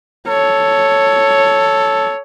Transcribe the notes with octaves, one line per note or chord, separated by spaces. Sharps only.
A4 C#5